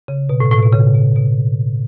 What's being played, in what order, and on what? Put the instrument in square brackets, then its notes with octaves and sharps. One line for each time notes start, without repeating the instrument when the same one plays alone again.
[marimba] C#3
B2
A2
A2
B2
C#3
B2
B2